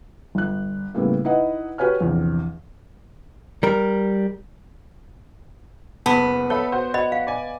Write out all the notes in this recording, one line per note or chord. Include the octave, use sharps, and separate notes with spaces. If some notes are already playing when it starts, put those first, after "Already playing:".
G1 F#6
A2 C#3 G3 A#3 B3 E4
D#4 E4 B4 D#5 F#5
F#4 G4 B4 C#5 G#5 F6
A#1 E2 C3
G3 A#4
F#1 B3 A5 D6
A4 C#5 E5 B5
F#4 C5
F#4 D5 D#5 B5
F5
D5 G#5